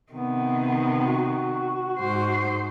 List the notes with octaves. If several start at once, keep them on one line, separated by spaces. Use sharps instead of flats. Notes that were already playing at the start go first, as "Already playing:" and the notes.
C3 D#3 B3
F#4
G#2 C5